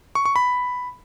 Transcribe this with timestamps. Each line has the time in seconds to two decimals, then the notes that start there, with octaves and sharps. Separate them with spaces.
0.15 C#6
0.25 C#6
0.36 B5